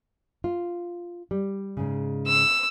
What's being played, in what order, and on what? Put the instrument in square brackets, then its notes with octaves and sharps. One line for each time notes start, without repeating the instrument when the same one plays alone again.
[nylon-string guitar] F4
G3
G#2 C#3
[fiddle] E6